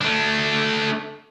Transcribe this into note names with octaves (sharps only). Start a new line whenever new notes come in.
A3 D4